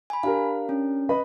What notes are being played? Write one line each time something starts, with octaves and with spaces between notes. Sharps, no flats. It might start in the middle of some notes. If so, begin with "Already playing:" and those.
G#5 B5
D4 G4 A#4 F5
C#4
B4 D#5 B5